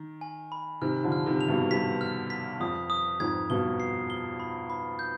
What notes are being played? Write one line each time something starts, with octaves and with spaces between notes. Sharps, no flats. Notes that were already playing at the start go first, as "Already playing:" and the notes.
Already playing: D#3
G#5
B5
C3 D#3 F6
D3 F3
F6
C3 D#3
F7
G2 B2
G2 B6
F6
B6
F2 D#6
D#6
F2 G#2 G#6
G2 B2 G7
C7
G7
B5
B5
G6